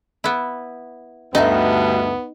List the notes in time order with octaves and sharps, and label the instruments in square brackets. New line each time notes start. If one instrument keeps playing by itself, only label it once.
[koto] B3 E4
[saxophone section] D2 G2 [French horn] B3 [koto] D#4 [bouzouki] A4 D#5 E5